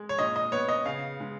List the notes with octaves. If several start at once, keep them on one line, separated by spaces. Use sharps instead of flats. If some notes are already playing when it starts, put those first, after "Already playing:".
Already playing: G#3
C#5
A#2 D#5
D#5
B3 C#5
D#5
C#3 F5
G#3